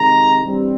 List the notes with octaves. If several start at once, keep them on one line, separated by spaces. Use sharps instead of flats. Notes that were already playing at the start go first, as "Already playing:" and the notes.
Already playing: C3 D#3 G#3 A#5
G2 E3 G3 C4